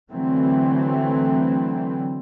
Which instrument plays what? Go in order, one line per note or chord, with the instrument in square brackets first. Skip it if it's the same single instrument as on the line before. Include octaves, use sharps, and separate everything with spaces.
[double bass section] D3 E3 F#3 A3 C4